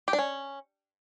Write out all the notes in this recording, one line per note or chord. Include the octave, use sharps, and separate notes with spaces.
G4
D4
C#4